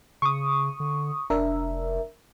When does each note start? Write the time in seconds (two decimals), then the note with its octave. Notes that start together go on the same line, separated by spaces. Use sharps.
0.22 C#3 C#6 D#6
0.80 D3
1.30 F1 D4 A#4 E5